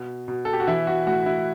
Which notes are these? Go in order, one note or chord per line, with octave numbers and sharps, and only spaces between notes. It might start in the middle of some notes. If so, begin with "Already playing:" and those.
Already playing: B2
B2
A4
G4
F#4
E3 E4
F#4
A2 F#4
E4